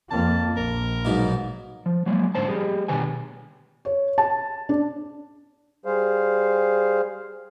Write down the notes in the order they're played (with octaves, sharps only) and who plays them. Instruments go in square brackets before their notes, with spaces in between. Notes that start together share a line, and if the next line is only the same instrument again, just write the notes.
[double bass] F2 A#3 [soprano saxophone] A5
[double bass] A#1 [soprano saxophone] A#4
[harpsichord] B1 G#2 B2
[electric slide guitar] F3
F#3 G#3 A#3
G#2 D3 C#4 C5 A5
G3 G4 G#4
B2 D3 D#3 B4 G#5
[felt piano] C#5
A5
D4
[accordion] G3 G#4 C5 F5